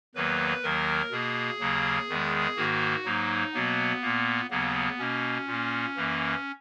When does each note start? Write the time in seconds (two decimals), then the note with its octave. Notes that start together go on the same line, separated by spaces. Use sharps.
0.15 E2 D#3 F#3 A#3 B4
0.63 D#2 D#3 F#3 A#3 A#4
1.11 B2 A#3 G#4
1.60 D#2 C#3 F#3 A#3
2.09 E2 D#3 G#3
2.57 G#2 D#3 A#3 F#4
3.05 G#2 F#3 A#3 D#4
3.54 B2 F#3 A#3 B3
4.02 A#2 A#3
4.50 D#2 C#3 F#3 A#3 B3
4.99 B2 A#3 C#4
5.47 A#2 A#3
5.97 F#2 E3 A#3